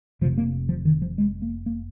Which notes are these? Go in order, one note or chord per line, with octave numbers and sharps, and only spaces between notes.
F1 F2 C3 F3
A#3
F3
D#3
F3
G#3
A#3
A#3